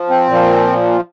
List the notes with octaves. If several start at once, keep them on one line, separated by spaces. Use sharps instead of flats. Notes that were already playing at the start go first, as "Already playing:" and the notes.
Already playing: F3
C4
A#2 F3